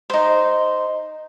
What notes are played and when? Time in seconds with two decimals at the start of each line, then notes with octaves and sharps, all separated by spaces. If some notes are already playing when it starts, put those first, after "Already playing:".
0.10 D#4 C5